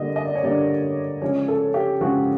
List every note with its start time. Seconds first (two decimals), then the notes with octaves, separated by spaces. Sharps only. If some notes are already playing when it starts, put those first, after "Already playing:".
Already playing: D3 G3 A#3 D4 D#5
0.16 D#5
0.25 D5
0.35 C#5
0.43 D3 G3 A#3 D4 D5
1.22 C#3 F3 G#3 C#4 C#5
1.48 A4
1.74 G4
2.01 C#3 F3 G#3 C#4 F#4